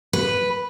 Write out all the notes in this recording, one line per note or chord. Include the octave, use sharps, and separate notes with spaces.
B4